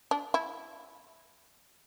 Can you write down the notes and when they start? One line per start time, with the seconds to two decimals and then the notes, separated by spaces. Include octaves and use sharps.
0.11 D4
0.34 E4